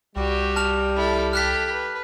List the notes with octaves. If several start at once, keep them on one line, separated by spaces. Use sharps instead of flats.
C2 G3 F#4 G4
A5 F6 F7
E4 A4
G4 A4 F6 F#6 B6
B4